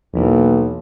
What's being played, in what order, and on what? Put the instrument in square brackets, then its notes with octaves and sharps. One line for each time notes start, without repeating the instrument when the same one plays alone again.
[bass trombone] B1 [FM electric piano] E2 E3 A#3